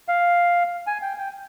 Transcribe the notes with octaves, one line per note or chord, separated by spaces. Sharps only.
F5
G#5
G5
G5